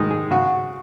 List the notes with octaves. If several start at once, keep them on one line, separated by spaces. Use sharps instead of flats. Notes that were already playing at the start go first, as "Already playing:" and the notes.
Already playing: D#3 G#3 D#4
G#4
C#3 F#4